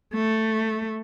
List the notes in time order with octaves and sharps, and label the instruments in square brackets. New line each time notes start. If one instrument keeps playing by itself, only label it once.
[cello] A3